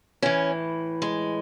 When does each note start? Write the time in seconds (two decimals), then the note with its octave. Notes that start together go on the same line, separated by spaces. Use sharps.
0.22 A2 E3 C#4
1.02 G#3